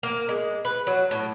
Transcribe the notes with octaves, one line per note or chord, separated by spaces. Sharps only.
A#3
G#3
B4
F#3
A2